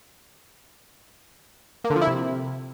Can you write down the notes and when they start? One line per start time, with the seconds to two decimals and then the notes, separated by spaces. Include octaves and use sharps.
1.84 A#3
1.90 D3
1.96 F3
2.02 E4
2.07 C3